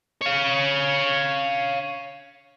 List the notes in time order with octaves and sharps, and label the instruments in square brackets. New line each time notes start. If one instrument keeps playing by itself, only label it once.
[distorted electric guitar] C#5 F5